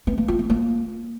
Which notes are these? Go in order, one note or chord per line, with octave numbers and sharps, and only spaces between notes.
B3
A#3
F4
B3
A#3